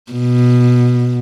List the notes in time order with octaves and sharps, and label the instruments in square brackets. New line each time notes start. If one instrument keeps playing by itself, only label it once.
[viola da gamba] B2